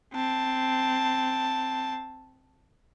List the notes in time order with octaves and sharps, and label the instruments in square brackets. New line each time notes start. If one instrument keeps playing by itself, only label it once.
[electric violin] C4 A5